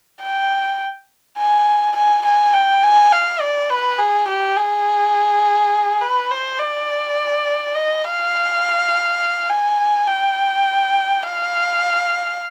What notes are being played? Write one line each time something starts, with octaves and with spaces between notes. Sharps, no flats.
G5
G#5
G#5
G#5
G5
G#5
F5
D5
B4
G#4
G4
G#4
B4
C5
D5
D#5
F5
G#5
G5
F5